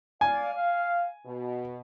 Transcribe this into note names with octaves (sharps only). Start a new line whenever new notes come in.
D5 F5 G#5
F5
B2